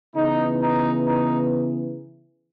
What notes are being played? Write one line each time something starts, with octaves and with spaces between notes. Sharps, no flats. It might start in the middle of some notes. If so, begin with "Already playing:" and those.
C#3 E3 B3 D#4
D#4
D#4